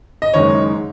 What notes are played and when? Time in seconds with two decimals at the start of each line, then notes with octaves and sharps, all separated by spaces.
0.22 D#5
0.34 F#1 F#2 D#3 G#3 C#5